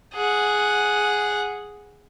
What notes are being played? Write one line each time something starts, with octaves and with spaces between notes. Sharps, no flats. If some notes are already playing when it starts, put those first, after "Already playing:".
G#4 F#5